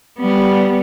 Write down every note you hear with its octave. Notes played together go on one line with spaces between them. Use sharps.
G3 B3